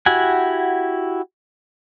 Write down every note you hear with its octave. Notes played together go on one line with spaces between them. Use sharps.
E4 F#4 G4 F#5 G#5